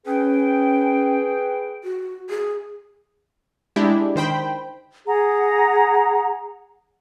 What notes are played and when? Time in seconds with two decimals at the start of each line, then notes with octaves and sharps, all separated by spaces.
0.06 C#4 G#4 B4 G5
1.84 F#4
2.30 G#4
3.76 G#3 D4 E4 G4
4.15 D#3 C5 G5 B5
5.06 G#4 F#5 A#5